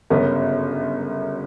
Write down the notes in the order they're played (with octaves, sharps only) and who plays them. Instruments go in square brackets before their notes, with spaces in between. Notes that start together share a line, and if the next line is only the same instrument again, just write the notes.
[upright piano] G1 F#2 C#3 F#3 B3 A#4